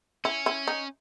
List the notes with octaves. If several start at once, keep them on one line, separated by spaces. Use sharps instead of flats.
C#4 E4
E4
D#4